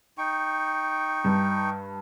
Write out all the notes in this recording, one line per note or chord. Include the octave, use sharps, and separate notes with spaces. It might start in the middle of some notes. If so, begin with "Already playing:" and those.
D#4 G5 C#6
G2